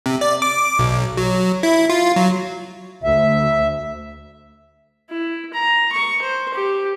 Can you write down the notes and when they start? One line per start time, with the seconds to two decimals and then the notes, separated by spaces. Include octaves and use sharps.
0.06 C3
0.21 D5
0.42 D6
0.79 B1
1.17 F#3
1.63 E4
1.90 F4
2.16 F#3
3.04 D2 E5
5.10 E4
5.53 A#5
5.92 C#6
6.21 C5
6.53 G4